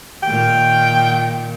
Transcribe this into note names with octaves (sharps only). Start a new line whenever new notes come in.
A#2 D#3 G5